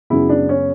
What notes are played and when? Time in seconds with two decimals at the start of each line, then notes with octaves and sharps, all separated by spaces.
0.10 F#2 C#3 G#3 B3 E4
0.29 D4
0.49 C#4